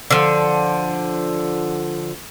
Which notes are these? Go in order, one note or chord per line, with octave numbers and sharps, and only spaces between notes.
D3 F3